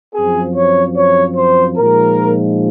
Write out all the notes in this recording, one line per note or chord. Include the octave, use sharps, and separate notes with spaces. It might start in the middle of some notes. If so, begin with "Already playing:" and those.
F#2 F3 C4 G#4
C#5
C#5
C5
A#2 F3 G#3 D#4 A#4